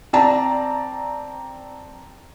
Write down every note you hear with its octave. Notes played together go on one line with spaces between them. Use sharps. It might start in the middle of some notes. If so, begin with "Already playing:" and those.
C4 D5 A5 A#5